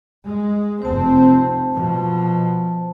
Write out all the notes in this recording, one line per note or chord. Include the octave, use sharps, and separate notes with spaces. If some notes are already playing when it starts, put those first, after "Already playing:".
G#3
F1 C4 C5 A5
B2 F3